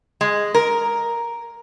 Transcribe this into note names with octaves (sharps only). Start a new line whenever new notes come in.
G#3
A#4